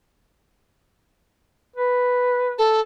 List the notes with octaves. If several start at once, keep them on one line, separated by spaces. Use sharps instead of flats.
B4
A4